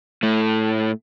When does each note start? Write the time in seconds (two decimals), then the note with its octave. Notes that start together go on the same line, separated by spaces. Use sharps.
0.23 A2 A3